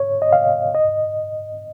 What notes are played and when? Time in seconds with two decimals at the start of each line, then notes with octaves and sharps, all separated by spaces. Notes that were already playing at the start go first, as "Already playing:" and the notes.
Already playing: C#5
0.22 D#5
0.33 F5
0.75 D#5